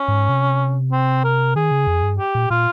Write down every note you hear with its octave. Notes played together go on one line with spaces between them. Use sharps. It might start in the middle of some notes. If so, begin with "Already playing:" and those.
Already playing: C#4
G#2
C3
C4
A#4
D#3 G#4
C#3
F2
G2
G4
A#2
A#2 F4